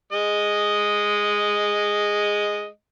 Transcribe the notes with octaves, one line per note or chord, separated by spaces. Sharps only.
G#3 D#5